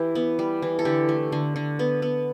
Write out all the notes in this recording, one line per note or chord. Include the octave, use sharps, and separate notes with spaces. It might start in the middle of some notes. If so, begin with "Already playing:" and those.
Already playing: E3 E4 G4
B3
G3
E3
A4
D3 G4
A3
D3
D3
B3
B3